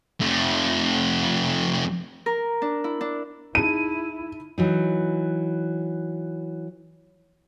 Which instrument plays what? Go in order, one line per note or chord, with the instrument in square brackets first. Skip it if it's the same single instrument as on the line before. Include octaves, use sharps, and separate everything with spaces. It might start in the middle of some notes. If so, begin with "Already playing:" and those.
[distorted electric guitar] F2 A3
[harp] A#4
D4
E4
D4
[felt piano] D#4 G#4 A5 [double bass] E4 [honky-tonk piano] D#7
[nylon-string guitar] E3 F#3 D#4